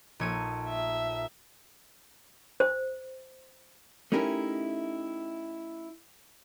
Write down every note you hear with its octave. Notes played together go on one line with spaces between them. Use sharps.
A#1 D#4 A4 C#5 D#5 D#7
E5
C5
A3 C#4 D#4 E4 G4 A#4